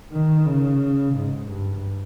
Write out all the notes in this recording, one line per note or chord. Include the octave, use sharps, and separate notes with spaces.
D#3
C#3
G#2
G2